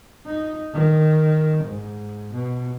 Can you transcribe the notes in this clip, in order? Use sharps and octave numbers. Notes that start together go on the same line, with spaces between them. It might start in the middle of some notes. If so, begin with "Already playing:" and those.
D#4
D#3
G#2
B2